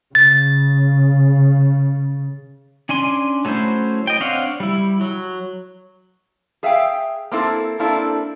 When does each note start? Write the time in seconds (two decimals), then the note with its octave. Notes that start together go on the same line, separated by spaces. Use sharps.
0.15 C#3 A6
2.89 C#4 D4 G#5 C6
3.45 F#3 A3 C#4 E4 C5
4.07 D#5 G5
4.21 C4 D4 C#5 F5 F#5
4.60 G3 E4
5.01 F#3
6.63 G#4 E5 F5 G5
7.32 A#3 C4 E4 A4
7.79 A#3 C4 D4 E4 A4